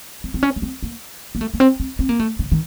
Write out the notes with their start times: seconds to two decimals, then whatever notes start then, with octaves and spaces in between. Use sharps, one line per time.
0.24 C4
0.34 C4
0.43 C#4
0.56 A#3
0.62 C4
0.83 A#3
1.35 A#3
1.41 A3
1.54 A#3
1.60 C4
1.80 C4
1.99 C4
2.09 A#3
2.20 A3
2.39 C#3
2.52 D#3